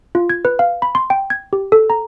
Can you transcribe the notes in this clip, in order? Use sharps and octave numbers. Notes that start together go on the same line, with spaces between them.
F4
G#6
B4
F5
B5
C6
G5
G#6
G4
A4
A#5